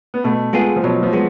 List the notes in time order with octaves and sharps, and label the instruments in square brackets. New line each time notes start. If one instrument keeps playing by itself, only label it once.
[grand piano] B3
[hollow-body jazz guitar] B2 [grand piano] A3
[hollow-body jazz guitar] G#3 B3 F4 G#4
[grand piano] F3
[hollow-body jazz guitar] B2 [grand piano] F#3
[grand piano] F3
[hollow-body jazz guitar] G#3 B3